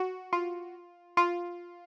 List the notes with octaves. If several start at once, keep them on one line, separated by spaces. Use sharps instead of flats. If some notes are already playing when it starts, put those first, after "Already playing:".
Already playing: F#4
F4
F4